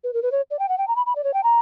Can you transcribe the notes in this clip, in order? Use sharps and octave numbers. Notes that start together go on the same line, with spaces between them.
B4
A#4
B4
C#5
D5
G5
F#5
G5
A#5
B5
B5
D5
C#5
G5
A#5